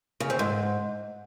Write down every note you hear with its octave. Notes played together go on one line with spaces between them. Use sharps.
C#3
C4
G#2